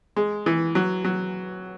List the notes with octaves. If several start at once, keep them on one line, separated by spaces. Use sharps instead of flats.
G#3
E3
F#3
F#3